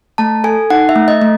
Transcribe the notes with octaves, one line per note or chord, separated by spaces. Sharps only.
A3 A5
A4 G#5
D#4 F#5
E5
A3
D#5
A3